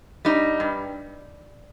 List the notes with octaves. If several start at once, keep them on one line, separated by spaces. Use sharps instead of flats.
G3 D#4
G2